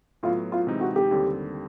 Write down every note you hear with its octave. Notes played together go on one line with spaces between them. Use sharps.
A2 F#3 B3 F4
F4
C3 E3 G#3 C4 D#4
F#4
G4
D#2 D3 G3 C4